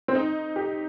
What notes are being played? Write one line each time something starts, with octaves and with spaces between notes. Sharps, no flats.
C4
D#4
G4